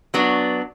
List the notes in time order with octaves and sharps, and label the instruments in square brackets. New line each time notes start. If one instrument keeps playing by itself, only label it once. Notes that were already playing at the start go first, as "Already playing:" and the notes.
[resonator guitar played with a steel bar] F#3 B3 D4